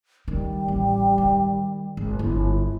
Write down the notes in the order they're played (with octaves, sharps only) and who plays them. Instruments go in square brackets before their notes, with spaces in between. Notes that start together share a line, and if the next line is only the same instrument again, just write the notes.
[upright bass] D#3 [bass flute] G3
[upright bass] A1
D#3
G#1
[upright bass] G1 [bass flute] E4